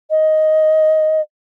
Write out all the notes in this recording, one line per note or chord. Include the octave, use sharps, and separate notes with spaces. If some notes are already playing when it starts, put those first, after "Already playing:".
D#5